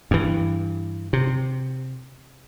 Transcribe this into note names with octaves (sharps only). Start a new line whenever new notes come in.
G2 E3
C3